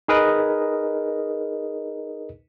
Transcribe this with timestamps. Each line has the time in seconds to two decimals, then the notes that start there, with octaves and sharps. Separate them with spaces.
0.08 D#4 G#4 A#4 B4 D#5